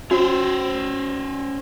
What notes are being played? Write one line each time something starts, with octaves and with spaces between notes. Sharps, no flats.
C#4 F#4 C5